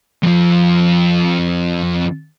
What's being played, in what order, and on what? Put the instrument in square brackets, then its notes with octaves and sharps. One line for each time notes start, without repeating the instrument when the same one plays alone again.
[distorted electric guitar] F2 F3